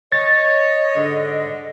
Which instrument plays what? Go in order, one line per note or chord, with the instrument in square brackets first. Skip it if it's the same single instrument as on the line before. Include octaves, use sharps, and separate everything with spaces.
[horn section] C#5 [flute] D#5 [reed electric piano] A6
[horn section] G#2 D3